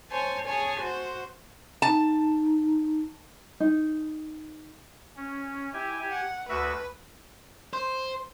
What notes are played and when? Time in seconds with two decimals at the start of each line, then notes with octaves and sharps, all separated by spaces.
0.11 C5 C#5 G#5 A5
0.45 G#4 C#5 G#5 A5
0.80 F#4 C5
1.82 D#4 A5
3.60 D#4
5.17 C#4
5.73 E4 G4 G#5
6.09 F#5
6.49 D2 F#4 B4 E5
7.73 C5